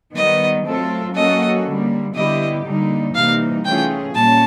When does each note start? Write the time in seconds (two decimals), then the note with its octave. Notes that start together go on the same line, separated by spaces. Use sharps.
0.15 D#3 G3 B3 D#5
0.66 F#3 A3 C4 F4 A4
1.15 F#3 A#3 C#4 F#4 A4 D#5
1.66 D3 G3 A#3
2.15 D3 G3 B3 E4 G4 D#5
2.65 D3 G3 A#3 D#4
3.15 C3 E3 G3 A#3 D#4 F5
3.64 E3 A3 C#4 F4 G#4 G5
4.14 A#2 G3 A#3 C#4 A5